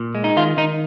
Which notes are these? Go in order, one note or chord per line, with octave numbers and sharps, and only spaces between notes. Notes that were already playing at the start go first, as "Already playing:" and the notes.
Already playing: A#2
G#3
D#4
D#3 F4
D#3 D#4